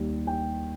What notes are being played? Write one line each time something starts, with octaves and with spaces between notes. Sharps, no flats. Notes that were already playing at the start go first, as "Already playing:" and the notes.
Already playing: D#2 D#3 G3
G5